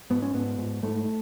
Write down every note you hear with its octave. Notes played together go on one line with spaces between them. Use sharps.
G#2 B3
C#4
G#2 B3
G#2
G#2 A3